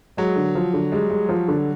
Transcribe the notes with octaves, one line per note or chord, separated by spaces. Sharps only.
F#3 G#3
D3
F3
D3
G3 G#3
G#3
F3
D3